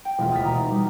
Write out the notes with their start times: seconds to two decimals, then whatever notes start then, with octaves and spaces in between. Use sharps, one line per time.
0.05 G5
0.18 E1 D2 F4 E5
0.32 D#6 F6 A6 B6
0.44 B2 A#5 D#6
0.59 D#4
0.71 G3